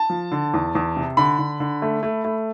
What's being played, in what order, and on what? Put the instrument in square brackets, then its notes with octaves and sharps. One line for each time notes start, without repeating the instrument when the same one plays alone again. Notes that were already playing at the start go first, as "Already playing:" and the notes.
Already playing: [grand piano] A5
F3
D3
E2
E2
C3
D3 B5
D3
D3
A3
A3
A3